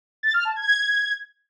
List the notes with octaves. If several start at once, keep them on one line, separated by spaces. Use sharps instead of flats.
A6
F6
A5
G#6